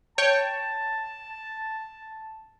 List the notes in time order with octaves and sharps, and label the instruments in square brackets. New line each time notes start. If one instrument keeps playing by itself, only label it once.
[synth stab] C#5 G5 [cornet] A5